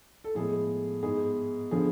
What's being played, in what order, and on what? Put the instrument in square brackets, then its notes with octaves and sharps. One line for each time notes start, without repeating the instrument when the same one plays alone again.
[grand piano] A4
A2 F3 G#3 B3 G#4
G#2 G#3 B3 G#4
D3 F3 B3 G#4